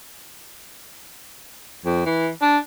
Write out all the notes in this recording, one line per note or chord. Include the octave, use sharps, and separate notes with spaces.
F2
E3
D4